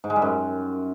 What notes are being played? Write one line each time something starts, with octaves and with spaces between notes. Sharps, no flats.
G#2
G#3
G3
F#2